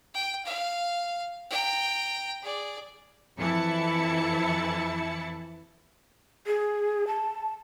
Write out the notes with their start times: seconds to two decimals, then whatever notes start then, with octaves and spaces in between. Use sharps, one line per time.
0.14 G5
0.46 F5
1.50 G5 A#5
2.42 G#4 D5
3.38 F2 E3 E4 A5 C#7
6.47 G#4
7.07 A5